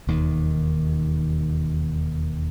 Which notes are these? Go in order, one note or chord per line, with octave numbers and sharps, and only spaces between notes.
E1 D#2 D#3